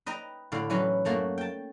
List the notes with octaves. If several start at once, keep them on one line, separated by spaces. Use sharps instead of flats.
B4 D#5 G5 A#5
A2 D3 F5
E3 F#3 C#4 B4
F#2 A3 A#3 F#4
G5 A5